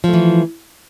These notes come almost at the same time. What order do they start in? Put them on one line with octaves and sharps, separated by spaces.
F3 A3 E3